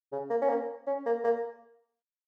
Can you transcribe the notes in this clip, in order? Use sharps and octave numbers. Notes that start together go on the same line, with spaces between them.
C#3
A#3
C#4
A#3
C#4
A#3
A#3